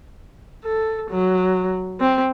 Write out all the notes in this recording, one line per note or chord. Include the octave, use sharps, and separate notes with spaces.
A4
F#3
C4